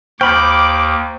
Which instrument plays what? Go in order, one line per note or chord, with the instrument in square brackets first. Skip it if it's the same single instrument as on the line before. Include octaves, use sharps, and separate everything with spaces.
[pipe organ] D#2 [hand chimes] C5 C#6 F6 [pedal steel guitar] G5 B5 [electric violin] D6